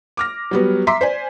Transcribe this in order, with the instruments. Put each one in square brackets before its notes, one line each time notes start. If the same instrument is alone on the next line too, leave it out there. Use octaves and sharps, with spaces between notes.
[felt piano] D6 F6 A#6
F#3 G3 B3
E5 A#5 C6 D6 B6
C5 D5 G#5